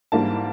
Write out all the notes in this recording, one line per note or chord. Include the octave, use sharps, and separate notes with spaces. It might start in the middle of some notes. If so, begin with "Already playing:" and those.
G#2 E3 G3 A#3 D4 A5